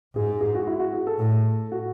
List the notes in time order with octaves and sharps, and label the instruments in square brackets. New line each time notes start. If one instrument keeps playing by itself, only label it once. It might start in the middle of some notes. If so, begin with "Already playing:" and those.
[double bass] G#2 [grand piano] G#4
[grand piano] G#4
F#4
E4
F#4
G#4
A4
[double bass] A2
[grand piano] F#4